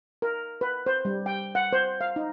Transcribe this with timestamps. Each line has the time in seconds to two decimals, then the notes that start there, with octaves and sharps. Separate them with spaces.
0.22 A#4
0.61 B4
0.86 C5
1.05 G3
1.26 G5
1.55 F#5
1.73 C5
2.01 F5
2.16 D#4